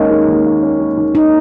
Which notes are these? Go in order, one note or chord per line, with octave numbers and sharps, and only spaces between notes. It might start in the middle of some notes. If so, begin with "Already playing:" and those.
Already playing: D#2 D#3 G#3 A#3 C#4
D#3
D#2
A#3
C#4
D#3
D#2
A#3 D#4